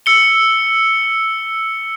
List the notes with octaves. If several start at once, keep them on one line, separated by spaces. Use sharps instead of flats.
E6 C#7 G7